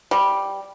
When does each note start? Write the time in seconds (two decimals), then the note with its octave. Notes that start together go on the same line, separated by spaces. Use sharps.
0.11 G3